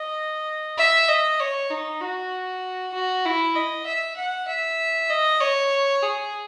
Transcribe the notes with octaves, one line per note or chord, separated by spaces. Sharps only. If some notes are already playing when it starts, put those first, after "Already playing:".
Already playing: D#5
E5
D#5
C#5
D#4
F#4
F#4
E4
D#5
E5
F#5
E5
D#5
C#5
G#4